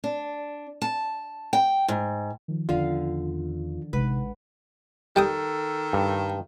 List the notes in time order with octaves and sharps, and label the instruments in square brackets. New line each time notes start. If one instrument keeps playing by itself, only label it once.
[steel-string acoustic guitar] D4
A5
G5
G#2
[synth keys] D#3 F3
[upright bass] E2 C#4 [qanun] D3 F5 [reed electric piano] F4
[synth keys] A1 G#3 F#5 [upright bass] C3 D#4 [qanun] B4
[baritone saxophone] D#3 [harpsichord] G3 G5 D#6 [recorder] A4
[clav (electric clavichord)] G2